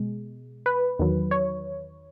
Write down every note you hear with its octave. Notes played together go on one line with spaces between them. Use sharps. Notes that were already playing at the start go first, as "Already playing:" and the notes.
Already playing: B2 G#3
B4
E2 D#3 F#3
C#5